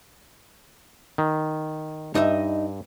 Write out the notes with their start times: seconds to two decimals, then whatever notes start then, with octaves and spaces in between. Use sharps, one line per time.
1.18 D#3
2.15 G2 D#4 D#5 E5